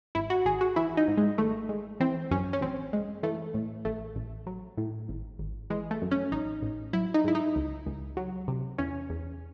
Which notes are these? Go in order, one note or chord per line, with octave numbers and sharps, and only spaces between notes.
G#1 E4
F#4
G#1 G#4
F#4
E3 E4
D#4
G#2
G#3
G#1 A3
G#3
E3 C4
F#2 C#4
C#4
A1 C4
G#3
E3 A3
A2
A1 A3
A1
F#3
A2
G#1
G#1
E3 G#3
A3
F#2
C#4
A1 D#4
A1
F#3 E4
D#4
G#2 E4
D#4
C#2
C#2
F#3
C3
E2 C#4
E2